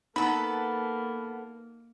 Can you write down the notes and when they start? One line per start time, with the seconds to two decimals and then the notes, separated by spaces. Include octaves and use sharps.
0.16 A#3 B3 D#4 A4 B5